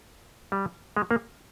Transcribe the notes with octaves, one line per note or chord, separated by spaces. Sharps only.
G3
G#3
A#3